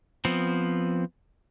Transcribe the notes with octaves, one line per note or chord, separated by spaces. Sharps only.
F3 B3 C4